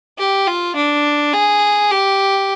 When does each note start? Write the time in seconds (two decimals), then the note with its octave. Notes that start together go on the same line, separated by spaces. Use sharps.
0.18 G4
0.47 F4
0.76 D4
1.33 G#4
1.91 G4